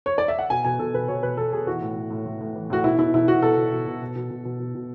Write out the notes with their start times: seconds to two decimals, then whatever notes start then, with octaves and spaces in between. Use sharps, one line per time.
0.06 C#5
0.18 D5
0.28 E5
0.39 F#5
0.50 B2 G#5
0.65 B2 G#5
0.79 B2 A4
0.94 B2 B4
1.08 B2 C#5
1.23 B2 B4
1.37 B2 A4
1.53 B2 G#4
1.67 E3 F#4
1.81 A2
1.96 A2
2.10 A2
2.26 A2
2.41 A2
2.55 E3
2.70 A2 F#4
2.84 B2 E4
2.98 B2 E4
3.14 B2 E4
3.28 B2 F#4
3.42 B2 A4
3.57 B2
3.72 B2
3.87 B2
4.01 B2
4.15 B2
4.30 B2
4.45 B2
4.60 B2
4.75 B2